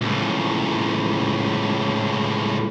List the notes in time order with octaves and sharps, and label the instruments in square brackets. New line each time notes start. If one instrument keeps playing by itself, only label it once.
[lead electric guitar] C#2 A2